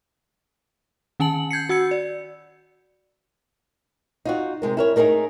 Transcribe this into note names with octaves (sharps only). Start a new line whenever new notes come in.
D#3 C#4 G#5 A5 F#7
G6 G#6 C7 C#7
F#4 F#5 E6 G#6 C#7
D5
D#4 F4 F#4
C3 G#3 A#4
E4 A#4 C#5
A3 D#4 G#4 A#4 D#5